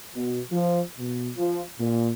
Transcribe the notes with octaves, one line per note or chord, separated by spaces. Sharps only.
B2
F3
B2
F3
A#2